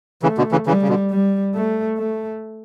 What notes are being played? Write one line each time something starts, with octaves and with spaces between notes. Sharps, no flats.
C#3 E3 A3
B2 D3
C#3 E3
C#3 E3 G3
C#3
B2 D3
G3
A3
A3